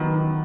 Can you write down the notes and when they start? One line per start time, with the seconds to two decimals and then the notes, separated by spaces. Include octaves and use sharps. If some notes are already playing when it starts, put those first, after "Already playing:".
Already playing: D#3 F#3 B3
0.16 D#3